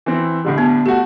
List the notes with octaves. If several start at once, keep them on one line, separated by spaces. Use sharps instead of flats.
E3 C4 E4
A2 D3 G3
B3
A3 F#4 G4